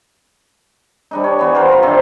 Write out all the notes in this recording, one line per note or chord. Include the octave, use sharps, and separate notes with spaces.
G3 D4 D#4
C#5
E3 B3
B3 F4 A#4 C5
F5 A#5
C3 D#3 C4 D4